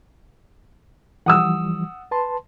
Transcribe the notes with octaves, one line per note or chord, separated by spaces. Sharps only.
E3 F3 G3 F#5 D#6 E6
B4 A5 C6